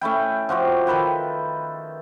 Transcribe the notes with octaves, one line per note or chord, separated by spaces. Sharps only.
A3 C#4 E4 G5
F3 F#4 G5 D6
D#3 A4 B4 G5